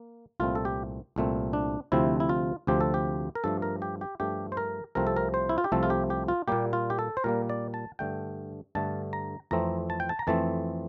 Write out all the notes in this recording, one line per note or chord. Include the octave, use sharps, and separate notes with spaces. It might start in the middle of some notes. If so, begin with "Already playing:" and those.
Already playing: A#3
C2 A#2 A3 C4 F4
A4
G4
C2 A#2 A3 C4
D4
D2 C3 F3 C4 E4
E4
F4
D2 C3 F3 C4 G4
A4
G4
A#4
G2 F3 A3 A4
A#4
G4
G4
G2 F3 A3 G4
C5
A#4
C2 C3 F3 A3 C4 A#4
A4
A#4
C5
E4
F4
G4
C2 C3 F3 A3 C4 A4
F4
G4
G4
F4
A#2 G3 A#3 G4
F4
G4
A4
C5
A#2 G3 A#3 A#4
D5
A5
G2 D3 A3 G5
G2 D3 A3 A5
A#5
F2 E3 A3 C4 A#5
A5
G5
A5
A#5
F2 E3 A3 C4 A5